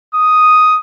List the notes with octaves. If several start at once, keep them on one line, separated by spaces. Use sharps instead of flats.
D#6